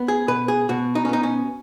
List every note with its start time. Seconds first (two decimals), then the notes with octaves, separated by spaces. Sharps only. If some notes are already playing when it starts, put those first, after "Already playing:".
Already playing: B3
0.08 G#4
0.28 B2 B4
0.48 G#4
0.69 B2 F#4
0.95 D#4
1.05 C#4
1.09 B3 D#4
1.23 C#4